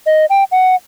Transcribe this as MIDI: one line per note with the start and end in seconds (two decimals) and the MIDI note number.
0.06 0.26 75
0.30 0.44 79
0.52 0.75 78